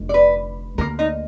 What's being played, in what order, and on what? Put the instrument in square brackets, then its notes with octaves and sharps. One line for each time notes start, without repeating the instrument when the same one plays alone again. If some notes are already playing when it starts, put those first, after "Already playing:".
Already playing: [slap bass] F1 F2 D3
[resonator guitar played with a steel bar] D5
B4
[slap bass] D2 D3 F3 A#3 [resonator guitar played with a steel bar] A#4
[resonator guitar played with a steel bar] D#4